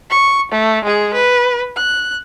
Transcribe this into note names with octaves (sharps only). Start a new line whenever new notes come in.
C#6
A3
G#3 G#4
B4
F#6